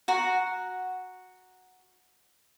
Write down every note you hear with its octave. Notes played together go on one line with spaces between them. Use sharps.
F#4 F#5 A#5